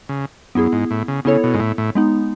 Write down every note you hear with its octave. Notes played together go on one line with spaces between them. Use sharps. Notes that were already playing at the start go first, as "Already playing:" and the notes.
C#3
F#2 B3 E4 G#4
G#2
A2
C#3
C#3 B3 E4 A4 C#5
B2
G#2
A2
A2
G#3 B3 D#4